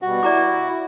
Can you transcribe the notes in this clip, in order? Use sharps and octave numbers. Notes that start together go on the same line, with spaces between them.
B2 G3 F#4
E4 D5 A#5 D6